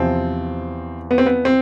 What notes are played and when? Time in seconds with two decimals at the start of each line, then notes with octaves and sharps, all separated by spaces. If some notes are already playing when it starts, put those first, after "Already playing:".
Already playing: E2 C3 F3 C4
1.11 B3
1.18 C4
1.26 B3
1.45 C4